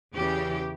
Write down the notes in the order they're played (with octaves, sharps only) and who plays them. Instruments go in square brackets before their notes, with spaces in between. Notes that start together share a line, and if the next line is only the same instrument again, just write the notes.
[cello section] E2 C#3 E3 G4